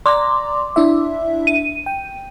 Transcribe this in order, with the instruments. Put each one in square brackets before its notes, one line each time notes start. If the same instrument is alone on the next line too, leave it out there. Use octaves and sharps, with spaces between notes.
[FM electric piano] D5 A#5 [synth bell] C6 D6
[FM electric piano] D4 E4 E5
[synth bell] D#7
[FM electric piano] G5